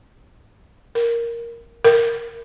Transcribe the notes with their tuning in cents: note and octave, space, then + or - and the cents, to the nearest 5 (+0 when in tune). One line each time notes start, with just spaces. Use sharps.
A#4 +0
A#4 -10